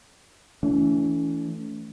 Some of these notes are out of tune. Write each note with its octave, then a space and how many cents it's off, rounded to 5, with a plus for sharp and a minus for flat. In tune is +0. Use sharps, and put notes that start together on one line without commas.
E3 +0 A3 +0 C#4 +45